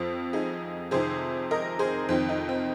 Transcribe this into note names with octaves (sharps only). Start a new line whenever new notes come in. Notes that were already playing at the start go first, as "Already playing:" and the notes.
Already playing: F2 F3 C4 F4
D#4 G#4
F2 C3 D#3 G#4 C5
A#4 D#5
G#4 C5
F2 D#3 C4
D#4
C4